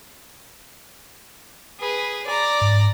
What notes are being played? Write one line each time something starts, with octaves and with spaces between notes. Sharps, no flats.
G#4 B4
D5 A#5
G#2